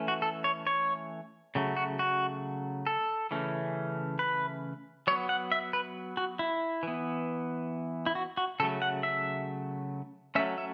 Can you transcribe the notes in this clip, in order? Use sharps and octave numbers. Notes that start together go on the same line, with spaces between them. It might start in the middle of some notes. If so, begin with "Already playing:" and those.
Already playing: E3 A3 C#4
F#4
A4
C#5
C#5
C#3 F#3 A3
F#4
F#4
A4
C#3 E3 A3 C#4
B4
F#3 B3 C#5
F#5
E5
B4
F#4
E4
E3 B3
E4
F#4
F#4
C#3 F#3 A3 A4
F#5
E5
F#3 A3 C#4 E5
E5